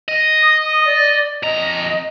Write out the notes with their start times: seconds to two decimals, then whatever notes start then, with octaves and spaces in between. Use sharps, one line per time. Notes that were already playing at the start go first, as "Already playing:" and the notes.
0.08 D#5
0.42 D#6
0.85 D5
1.43 F2 D#5 A#5